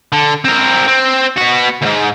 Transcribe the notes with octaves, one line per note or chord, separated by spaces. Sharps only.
D3
C4 A#4
C4
B3 F#4
D#2 G#2